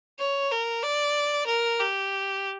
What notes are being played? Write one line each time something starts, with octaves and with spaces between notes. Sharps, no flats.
C#5
A#4
D5
A#4
G4